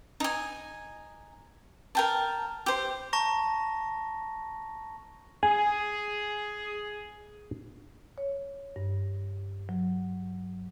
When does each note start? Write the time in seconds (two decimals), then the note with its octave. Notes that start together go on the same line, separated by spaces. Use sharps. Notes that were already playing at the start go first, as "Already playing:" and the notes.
0.20 D#4 G#5
1.95 A#4 G5 A5
2.66 G4 C5
3.13 A5 A#5 C#6 A#6
5.43 G#4 G#5
8.18 C#5
8.76 G2
9.69 F#3